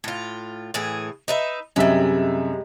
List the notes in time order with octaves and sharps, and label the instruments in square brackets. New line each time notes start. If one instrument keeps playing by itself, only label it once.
[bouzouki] A2 F4
A2 E3 G#4
D#4 B4 E5
[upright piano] F#2 C3 E5 [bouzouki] G3 G#3